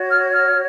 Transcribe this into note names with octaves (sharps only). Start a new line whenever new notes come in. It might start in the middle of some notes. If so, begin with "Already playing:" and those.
Already playing: F#4 C#5
F6
F6